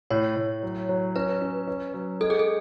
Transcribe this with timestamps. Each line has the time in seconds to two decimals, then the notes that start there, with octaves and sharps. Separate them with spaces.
0.10 A2 C#5
0.36 A2
0.63 F#3
0.89 F#3
1.16 C#4 B4
1.41 C#4
1.67 C#4
1.94 F#3
2.21 G#3 A4
2.30 G#4
2.39 A4